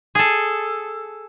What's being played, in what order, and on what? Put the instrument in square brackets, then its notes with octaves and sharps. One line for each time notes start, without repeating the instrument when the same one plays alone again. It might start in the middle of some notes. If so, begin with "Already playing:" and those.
[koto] G#4 A4